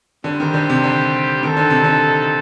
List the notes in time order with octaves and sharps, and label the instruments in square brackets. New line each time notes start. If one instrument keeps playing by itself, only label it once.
[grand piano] D3 [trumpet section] G3 C4 G4 C5
[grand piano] D#3
D3
C3
D3
[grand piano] D#3 [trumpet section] C4 D#4 A4
[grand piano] D3
C3
D3